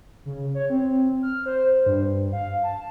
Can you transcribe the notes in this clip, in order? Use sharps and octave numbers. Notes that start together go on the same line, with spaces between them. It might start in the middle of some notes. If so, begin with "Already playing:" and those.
C#3
C#5
C4
F6
C5
G2
F5
A5